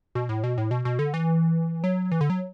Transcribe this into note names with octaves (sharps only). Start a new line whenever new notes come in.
B2
A2
B2
A2
B2
B2
D3
E3
F#3
E3
D3
F#3